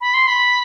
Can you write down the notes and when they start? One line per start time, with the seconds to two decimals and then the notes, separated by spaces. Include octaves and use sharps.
0.01 B5
0.14 C6
0.27 B5